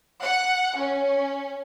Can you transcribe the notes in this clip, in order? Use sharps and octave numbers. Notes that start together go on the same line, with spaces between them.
F#5
C#4